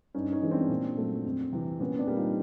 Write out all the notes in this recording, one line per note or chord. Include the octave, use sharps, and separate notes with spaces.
G2 C#4 D#4
C#4 D#4
E3 G#3
C4 D4
A#2
F#3 A3
F2
C3 E3
A#2 B3 C#4
C4 D4
G3 A#3
D#4 F4